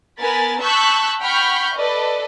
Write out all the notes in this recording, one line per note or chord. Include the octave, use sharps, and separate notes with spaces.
B3 A#4 G#5 B5 A6
A5 C#6 E6 F#6 G6 B6
F#5 G5 B5 C#6 F6 G6
A4 B4 D5 D#5